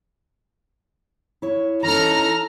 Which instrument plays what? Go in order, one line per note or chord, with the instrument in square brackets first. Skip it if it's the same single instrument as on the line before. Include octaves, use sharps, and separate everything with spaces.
[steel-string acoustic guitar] E4 C#5
[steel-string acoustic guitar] E3 C#4 D#4 [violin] A4 F6 [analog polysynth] A#5